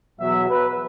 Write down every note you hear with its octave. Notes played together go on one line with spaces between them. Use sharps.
E2 B2 F#3 E5
B4